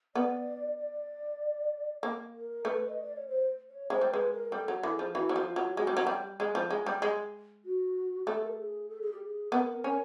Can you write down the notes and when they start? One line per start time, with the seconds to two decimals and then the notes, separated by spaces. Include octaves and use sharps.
0.15 B3 D5
0.77 D5
2.03 A#3
2.34 A#4
2.65 A3 B4
2.88 D#5
3.01 D5
3.15 C#5
3.28 C5
3.70 C#5
3.90 G#3 C5
4.01 G3
4.11 G#3 B4
4.32 A#4
4.52 G3 A4
4.68 F#3 G#4
4.73 A4
4.83 E3
4.95 F3 G#4
5.14 E3 F#4
5.29 F#3
5.36 F3
5.45 F4
5.56 F#3
5.71 G4
5.77 G#3 F#4
5.87 G3
5.97 F#3 G4
6.07 G3
6.40 G#3
6.55 F3
6.70 G#3
6.86 G3
7.02 G#3
7.65 F#4
8.27 A3 G4
8.43 A#4
8.51 A4
8.58 G#4
8.89 A4
9.01 G#4
9.12 G4
9.24 G#4
9.52 B3 A#4
9.83 C#4 A#4